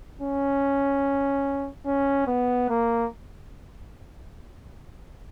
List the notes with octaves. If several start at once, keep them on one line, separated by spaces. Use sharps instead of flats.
C#4
C#4
B3
A#3